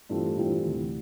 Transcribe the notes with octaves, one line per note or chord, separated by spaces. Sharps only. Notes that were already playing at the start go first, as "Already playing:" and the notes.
G2 E3 A3 C4 F4
G2 E3 A3 C4 F4
D2 C3 E3